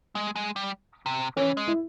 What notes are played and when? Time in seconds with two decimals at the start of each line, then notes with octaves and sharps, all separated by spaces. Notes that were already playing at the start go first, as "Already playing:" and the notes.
0.15 G#3
0.36 G#3
0.56 G3
1.06 C3
1.37 E3 C#4
1.57 G#3
1.68 E4